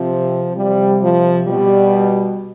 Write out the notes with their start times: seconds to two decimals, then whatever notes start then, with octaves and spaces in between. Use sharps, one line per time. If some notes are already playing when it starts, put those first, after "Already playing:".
Already playing: C3 F3
0.57 C3 F3 G3
1.02 F3
1.48 B2 G3